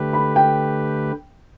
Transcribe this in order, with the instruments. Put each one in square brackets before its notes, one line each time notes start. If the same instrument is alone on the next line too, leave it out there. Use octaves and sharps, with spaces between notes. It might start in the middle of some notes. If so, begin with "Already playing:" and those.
Already playing: [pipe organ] D3 A3 G4 B4
[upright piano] B5
G5